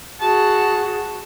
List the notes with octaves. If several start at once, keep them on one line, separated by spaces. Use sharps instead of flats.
F#4 G#4 A5